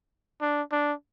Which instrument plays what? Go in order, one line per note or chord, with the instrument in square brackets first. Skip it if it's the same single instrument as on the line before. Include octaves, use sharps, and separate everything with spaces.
[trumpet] D4
D4